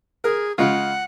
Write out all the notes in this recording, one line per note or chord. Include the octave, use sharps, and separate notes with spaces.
G#4 A#4
C#3 G#3 F4 F#5